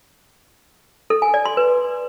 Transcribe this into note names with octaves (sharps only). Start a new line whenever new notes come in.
A4
G#5
D5
C6
B4